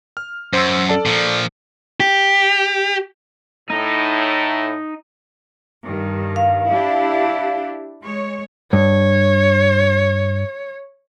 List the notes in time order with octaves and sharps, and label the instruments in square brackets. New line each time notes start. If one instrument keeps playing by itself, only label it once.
[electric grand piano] F6
[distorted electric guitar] F#2 [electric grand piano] C5 C6 E6
[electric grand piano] A4 D5 A5
[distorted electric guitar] A#2 F3
[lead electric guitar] G4
[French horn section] A2 [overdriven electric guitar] D#4
[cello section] G2 D#3
[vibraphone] F5
[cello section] D4 E4 G4
G#3 C#5
[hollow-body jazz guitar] G2 [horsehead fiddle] C#5